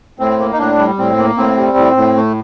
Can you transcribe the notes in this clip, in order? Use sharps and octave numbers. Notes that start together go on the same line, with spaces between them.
A2 C4
A#3
D#4
A2 D4
G3
A2 C4
A#3
A2 C4
G3
A2
A2
A3